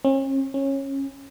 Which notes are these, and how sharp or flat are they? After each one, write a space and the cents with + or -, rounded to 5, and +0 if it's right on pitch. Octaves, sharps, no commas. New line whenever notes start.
C#4 -40
C#4 -20